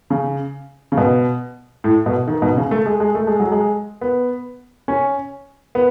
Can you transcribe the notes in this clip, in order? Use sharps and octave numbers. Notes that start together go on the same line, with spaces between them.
C#3
C#3
B2
A2
B2
D#3
B2
C#3
A3
G#3
G#3
A3
G#3
F#3
G#3
B3
C#4
B3